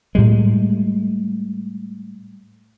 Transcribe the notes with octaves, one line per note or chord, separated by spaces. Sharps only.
A2 G3 G#3